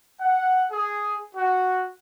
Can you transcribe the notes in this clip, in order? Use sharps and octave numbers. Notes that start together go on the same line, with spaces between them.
F#5
G#4
F#4